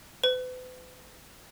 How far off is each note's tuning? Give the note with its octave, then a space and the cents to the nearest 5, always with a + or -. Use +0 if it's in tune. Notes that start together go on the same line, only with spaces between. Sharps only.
B4 +45